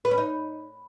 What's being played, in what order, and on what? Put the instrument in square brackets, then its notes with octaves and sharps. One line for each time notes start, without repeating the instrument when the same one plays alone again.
[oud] B4
C#4
D#4